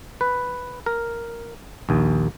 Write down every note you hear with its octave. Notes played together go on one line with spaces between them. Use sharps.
B4
A#4
A#1 D#2